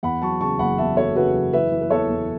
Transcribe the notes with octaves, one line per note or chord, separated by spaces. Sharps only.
E2 F#5 B5
F#3 A5 C#6
C#3 A5 C#6
F#1 F#5 B5
E2 E5 A5
F#3 A4 C#5
C#3 F#4 B4
F#1
E3 B4 E5
E3
B4
E2 A4 C#5
E2